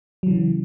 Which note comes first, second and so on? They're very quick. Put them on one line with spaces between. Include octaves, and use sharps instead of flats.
F#3 E3 C#3